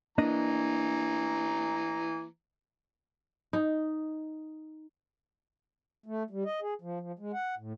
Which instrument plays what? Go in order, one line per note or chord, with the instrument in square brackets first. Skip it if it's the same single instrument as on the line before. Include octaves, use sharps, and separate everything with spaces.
[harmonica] E3 A#5 [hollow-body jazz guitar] A#3 D4 D#5
[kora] D#4
[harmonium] A3
G3
D#5
G#4
F3
F3
G#3
F#5
A2